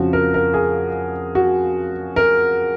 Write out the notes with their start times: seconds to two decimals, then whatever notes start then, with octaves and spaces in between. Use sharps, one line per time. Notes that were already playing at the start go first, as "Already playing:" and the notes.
Already playing: F2 C#3 F3 F#4
0.13 A#4
0.34 A#4
0.54 G#4
1.35 F#4
2.16 A#4